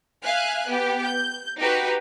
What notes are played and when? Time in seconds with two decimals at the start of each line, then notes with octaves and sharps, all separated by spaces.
0.22 E5 F5 G#5 F#6
0.67 B3 G4
1.04 G6
1.59 D#4 F#4 G4 B4